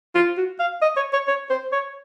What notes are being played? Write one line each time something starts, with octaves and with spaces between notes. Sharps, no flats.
F4
F#4
F5
D#5
C#5
C#5
C#5
C5
C#5